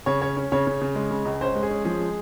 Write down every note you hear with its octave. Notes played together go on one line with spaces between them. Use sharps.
C#3 C#5
C#4 C#5
C#4
C#3 C#5
C#3
C#3
G#3
C#3
C#2
C#4 C5
G#3
G#4
C#4
F3 G#4
G#3